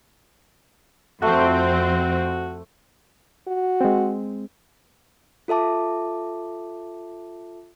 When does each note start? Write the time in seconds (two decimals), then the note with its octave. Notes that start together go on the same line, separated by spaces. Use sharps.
1.22 F2 A3 C4 F#4
3.47 F#4
3.81 G#3 C4
5.48 F4 A4 E5 A5 D6